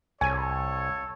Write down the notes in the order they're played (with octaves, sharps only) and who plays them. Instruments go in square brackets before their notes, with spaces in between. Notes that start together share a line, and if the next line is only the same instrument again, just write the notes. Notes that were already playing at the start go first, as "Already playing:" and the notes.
[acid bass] C2 [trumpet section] A4 C#5 [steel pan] G#5